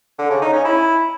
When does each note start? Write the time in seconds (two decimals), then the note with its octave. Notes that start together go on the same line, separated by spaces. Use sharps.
0.18 D3
0.30 C#3
0.42 D#4
0.53 C#4
0.65 E4